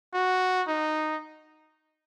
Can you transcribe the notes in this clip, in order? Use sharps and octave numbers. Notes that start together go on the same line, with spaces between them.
F#4
D#4